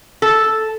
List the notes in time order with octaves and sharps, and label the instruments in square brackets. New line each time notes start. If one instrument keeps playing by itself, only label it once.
[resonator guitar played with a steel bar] A4